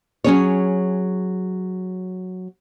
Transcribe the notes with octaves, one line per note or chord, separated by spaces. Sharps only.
F#3 C#4 G#4 C#5